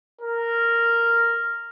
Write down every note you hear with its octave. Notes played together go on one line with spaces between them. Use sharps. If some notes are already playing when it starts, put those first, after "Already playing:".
A#4